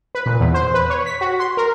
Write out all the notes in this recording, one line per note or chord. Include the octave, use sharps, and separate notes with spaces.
B4
A#2
E2
C5
B4
C#5
B6
F#4
C6
A#4